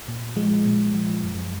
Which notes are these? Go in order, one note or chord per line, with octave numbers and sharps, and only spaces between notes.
A#2
F3 G#3
A#2
F3
F#2